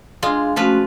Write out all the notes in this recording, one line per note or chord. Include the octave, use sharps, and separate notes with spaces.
G#3 D4 F4 G#4 F5
F3 A3 C#4 F4 F#4 B4